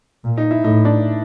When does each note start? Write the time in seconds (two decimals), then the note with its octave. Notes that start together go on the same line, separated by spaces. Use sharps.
0.24 A#2
0.38 D#4
0.51 E4
0.64 A2 D#4
0.85 D4